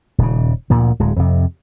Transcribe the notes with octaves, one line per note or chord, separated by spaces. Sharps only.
D#1 C#3
D2 A#2 F3
D1 G#3
F2 C3